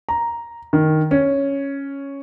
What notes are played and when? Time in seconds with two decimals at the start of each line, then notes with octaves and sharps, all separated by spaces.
0.09 A#5
0.73 D#3
1.11 C#4